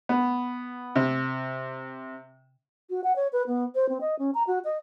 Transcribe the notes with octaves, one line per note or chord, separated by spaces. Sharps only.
B3
C3
F#4
F#5
C#5
B4
B3
C5
C4
D#5
C#4
A#5
F#4
D#5